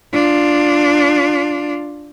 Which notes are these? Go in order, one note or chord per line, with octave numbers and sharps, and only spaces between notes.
D4 F4